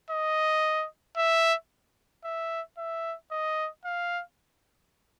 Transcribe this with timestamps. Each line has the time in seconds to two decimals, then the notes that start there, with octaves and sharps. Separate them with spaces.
0.11 D#5
1.17 E5
2.24 E5
2.78 E5
3.31 D#5
3.85 F5